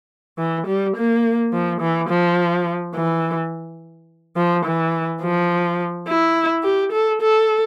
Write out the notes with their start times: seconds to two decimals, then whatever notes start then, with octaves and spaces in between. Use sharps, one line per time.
0.38 E3
0.67 G3
0.96 A#3
1.53 F3
1.81 E3
2.09 F3
2.95 E3
4.36 F3
4.65 E3
5.21 F3
6.08 E4
6.64 G4
6.92 A4
7.21 A4